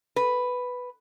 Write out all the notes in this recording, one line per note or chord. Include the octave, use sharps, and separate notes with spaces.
B4